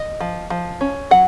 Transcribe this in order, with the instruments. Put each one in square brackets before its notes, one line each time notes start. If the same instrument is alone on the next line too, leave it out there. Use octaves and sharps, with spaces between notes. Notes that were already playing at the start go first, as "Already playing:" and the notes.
Already playing: [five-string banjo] D#5
F3
F3
C#4
F#3 F#5